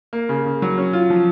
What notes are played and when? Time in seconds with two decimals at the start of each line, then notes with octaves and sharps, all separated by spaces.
0.13 A#3
0.29 C#3
0.46 C#3
0.62 F#3
0.78 C#4
0.93 F4
1.10 F3